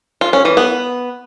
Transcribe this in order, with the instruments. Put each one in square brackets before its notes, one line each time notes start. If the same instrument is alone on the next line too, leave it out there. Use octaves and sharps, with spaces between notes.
[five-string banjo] F4
C#4
E3
B3